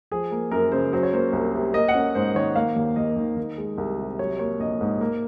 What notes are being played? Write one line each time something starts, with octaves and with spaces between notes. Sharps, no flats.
F3 G#4
A#3
F#2 A#4
C#3 C5
F#3 C5
C#5
A#3 C5
C2
C3
A#3 D#5
F#5
C#4
G#2 C5
D#3 C#5
A#3 F5
D#2
D#2 D#5
D#3
D#3
G#3
C2
C3
F#3 C#5
A#3 C#5
A#1 D#5
G#2
A#3